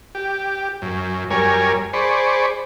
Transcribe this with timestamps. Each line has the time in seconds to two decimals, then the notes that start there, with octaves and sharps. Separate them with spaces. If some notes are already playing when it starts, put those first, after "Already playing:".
0.15 G4
0.82 F#2
1.30 F#2 G3 A#4 C#5 G#5
1.93 G#4 C5 D5 B5 C#6